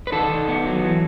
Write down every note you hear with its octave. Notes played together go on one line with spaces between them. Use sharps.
B4
D#3 A4
D#3
B3
F#3
E3